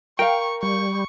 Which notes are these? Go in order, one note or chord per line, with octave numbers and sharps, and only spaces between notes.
A#4 F5 G5 C#6
G3 C#6